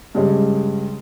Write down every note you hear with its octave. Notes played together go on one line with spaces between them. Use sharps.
G2 C#3 G3 G#3